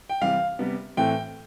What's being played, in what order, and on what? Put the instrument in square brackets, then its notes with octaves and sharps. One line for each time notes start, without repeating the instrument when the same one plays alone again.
[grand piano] G5
C3 E3 G3 C4 F5
C3 G3 B3
A2 E3 A3 C4 G5